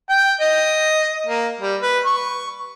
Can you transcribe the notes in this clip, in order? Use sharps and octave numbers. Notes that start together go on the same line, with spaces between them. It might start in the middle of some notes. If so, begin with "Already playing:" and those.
G5
D#5
A#3
G3
B4
C#6